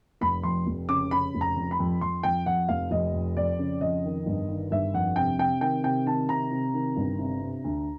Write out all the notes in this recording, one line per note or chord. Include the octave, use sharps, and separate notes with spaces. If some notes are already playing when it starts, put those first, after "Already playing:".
F1 B5
F2 C6
F1
C#3 D6
C#3 B5
F1
A#5
F2
B5
F2
F2 C6
F2 G5
F2 F#5
F1 F5
F1 D#5
F2
F2 D5
C#3
F2 D#5
D#3
G1
D#3
G1 E5
F2 F#5
C3 G5
C3 G5
D#3 G5
C3 G5
D#3 A5
C3 A#5
C3
D#3
G1
C3
C3
D2